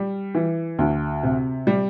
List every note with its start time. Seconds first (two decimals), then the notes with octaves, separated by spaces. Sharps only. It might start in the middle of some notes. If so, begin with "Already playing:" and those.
Already playing: G3
0.35 E3
0.79 D2
1.23 C3
1.67 G3